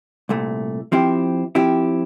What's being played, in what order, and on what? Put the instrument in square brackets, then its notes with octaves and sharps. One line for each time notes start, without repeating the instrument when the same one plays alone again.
[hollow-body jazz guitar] C2 A#2 A3
F3 C4 E4 G4
F3 C4 E4 G4